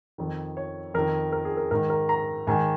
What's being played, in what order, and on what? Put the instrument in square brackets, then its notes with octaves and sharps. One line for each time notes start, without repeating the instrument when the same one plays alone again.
[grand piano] F2 D#3
C#5
F2 D#3 A#4
A#4
G#4
A#4
G#2 D#3 A#4
A#4
A#5
G#2 D#3 G#5